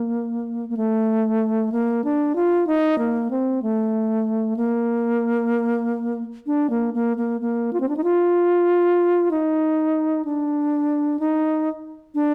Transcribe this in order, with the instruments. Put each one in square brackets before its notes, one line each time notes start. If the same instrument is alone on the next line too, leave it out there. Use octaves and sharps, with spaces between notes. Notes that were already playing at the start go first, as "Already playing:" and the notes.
Already playing: [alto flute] A#3
A#3
A3
A#3
D4
F4
D#4
A#3
C4
A3
A#3
D4
A#3
A#3
A#3
A#3
F4
C4
D4
D#4
F4
D#4
D4
D#4
D4